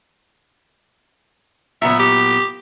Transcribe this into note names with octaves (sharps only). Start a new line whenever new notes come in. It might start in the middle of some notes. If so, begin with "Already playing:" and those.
A#2 F#3 B3 E5
G4